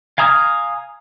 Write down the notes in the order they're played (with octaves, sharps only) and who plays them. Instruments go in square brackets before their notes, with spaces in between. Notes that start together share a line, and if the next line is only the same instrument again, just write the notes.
[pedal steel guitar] F5 G#5 A#5 D#6 F6